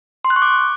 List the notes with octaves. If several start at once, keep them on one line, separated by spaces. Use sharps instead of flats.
C6
F#6
C#6
D6